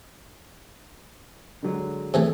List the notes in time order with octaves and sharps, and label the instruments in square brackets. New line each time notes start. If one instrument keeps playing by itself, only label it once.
[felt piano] D3 F#3 G#3
[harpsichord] C3 E3 A3 [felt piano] G#4 A4